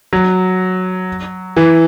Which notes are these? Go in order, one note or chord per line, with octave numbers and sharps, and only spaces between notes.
F#3
E3